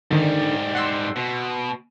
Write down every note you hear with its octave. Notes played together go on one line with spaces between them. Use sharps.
G#2 D3 D#3 G3
F#5 C6 E6
B2